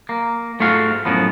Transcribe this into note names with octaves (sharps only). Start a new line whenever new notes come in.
A#3
G#2 A3 F4 F#4 F5
F#2 A2 F3 B3